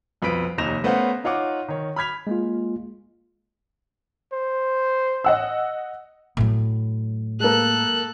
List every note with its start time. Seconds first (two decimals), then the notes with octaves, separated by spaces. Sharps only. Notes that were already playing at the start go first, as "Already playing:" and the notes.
0.22 B1 F2 B4 B6 D7
0.58 F1 D#2 D#4 A#6 E7 F7
0.84 A3 B3 C#4 C5 F5 F#5
1.24 D#4 F4 C#5 F#5 D6
1.68 D#3 C#5
1.96 B5 F6 G#6 B6 F7
2.27 G#3 A#3 F4
4.33 C5
5.24 D#5 F#5 E6
6.37 A2 F#3
7.40 G#3 A#3 A4 F#6